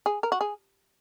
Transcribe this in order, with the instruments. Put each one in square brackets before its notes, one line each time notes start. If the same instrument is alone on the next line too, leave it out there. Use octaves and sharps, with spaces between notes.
[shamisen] G#4
A#4
F#4
G#4